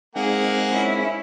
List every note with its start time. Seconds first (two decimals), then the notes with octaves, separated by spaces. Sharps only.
0.16 G#3 A#3 C4 D#4 G#4 F#5
0.71 C#4 E4